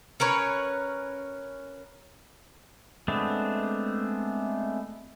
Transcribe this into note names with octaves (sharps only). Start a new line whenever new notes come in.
C#4 A#4 B4 C#5
G#3 A3 B3 C4 D4